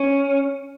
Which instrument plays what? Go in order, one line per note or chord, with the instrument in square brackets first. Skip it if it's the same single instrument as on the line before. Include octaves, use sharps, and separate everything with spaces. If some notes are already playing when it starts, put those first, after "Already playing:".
Already playing: [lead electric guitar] C#4